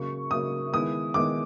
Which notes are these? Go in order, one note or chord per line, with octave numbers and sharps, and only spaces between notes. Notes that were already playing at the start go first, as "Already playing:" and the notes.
Already playing: C#3 F#3 A#3 C#6
C#3 F#3 A#3 D#6
D#3 G#3 B3 E4 D#6
D#3 G#3 B3 E4 D6